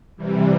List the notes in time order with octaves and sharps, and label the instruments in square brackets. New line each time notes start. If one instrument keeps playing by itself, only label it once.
[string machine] C3 E3 G3